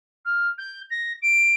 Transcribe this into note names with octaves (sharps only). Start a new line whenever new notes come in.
F6
G6
A#6
D7